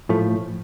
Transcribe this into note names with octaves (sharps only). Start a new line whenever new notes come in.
A2 F3 A3